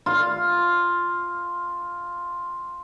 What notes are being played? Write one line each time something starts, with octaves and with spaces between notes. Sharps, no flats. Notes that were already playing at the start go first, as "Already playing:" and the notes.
F4 F5